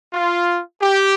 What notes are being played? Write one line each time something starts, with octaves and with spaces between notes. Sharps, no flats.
F4
G4